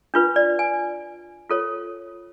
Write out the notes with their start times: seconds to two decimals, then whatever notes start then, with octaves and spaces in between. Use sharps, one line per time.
0.14 D4 F4 B4
0.36 D5
0.59 G#5
1.50 F4 A4 C#5